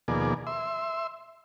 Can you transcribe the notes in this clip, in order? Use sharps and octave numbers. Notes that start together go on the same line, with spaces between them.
D#2 B2 F3 A#3 G#4 D5
E5 C6